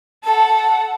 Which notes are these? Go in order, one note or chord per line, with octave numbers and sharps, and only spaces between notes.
A4 F#5 A5